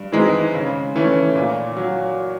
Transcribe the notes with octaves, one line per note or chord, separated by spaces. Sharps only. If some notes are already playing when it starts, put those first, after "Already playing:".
Already playing: G2
E3 G#3 C4 D#4
C#3
E3 A3 C#4
A#2
F#3